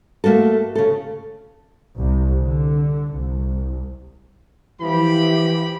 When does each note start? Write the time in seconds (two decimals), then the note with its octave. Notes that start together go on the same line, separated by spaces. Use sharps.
0.24 A3 A#3 F#4 A4
0.75 C#3 A4
1.98 C2
2.42 D3
3.11 C2
4.81 E3 F3 E4 G4 B5